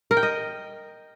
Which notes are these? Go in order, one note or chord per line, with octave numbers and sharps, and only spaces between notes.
A#4
G5
D#5